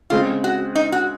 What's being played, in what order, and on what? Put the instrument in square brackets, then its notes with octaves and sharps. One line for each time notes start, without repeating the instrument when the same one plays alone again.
[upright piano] C#3 G#3 C4 [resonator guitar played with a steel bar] F4
[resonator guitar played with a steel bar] F#4
D#4
F#4